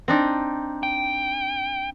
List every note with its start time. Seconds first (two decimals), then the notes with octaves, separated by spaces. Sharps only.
0.08 C4 D4 D#4
0.83 G5